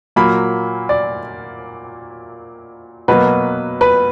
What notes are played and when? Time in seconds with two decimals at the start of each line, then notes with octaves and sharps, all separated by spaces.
0.16 A#2 F#3 A#3 B5
0.89 D5
3.08 B2 F#3 A#3 B4
3.81 B4